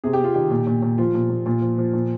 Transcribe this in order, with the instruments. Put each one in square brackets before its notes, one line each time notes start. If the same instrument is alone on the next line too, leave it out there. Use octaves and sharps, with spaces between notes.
[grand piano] C3 G#4
G4
C3 F4
D#3 G4
A#2
A#2
A#2
F3 F4
A#2
A#2
A#2 F4
F3
F3
A#2